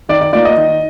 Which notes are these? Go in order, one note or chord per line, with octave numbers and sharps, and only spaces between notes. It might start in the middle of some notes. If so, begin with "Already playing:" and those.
D#3 D5
D5
A#3 F4 D5
D#5
D#3